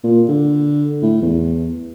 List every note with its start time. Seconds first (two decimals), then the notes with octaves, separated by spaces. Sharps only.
0.04 A#2
0.29 D3
1.02 A2
1.22 E2